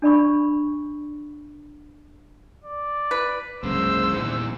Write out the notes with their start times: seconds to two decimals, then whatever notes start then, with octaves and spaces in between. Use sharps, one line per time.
0.02 D4 D5 B5 C#6
2.64 D5
3.11 B4
3.63 C2 F#2 C#3 G#3 A#3 C5 E6
4.13 E2 A#2 D#3 E3